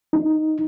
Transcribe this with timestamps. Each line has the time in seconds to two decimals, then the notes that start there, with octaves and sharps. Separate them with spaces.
0.13 D#4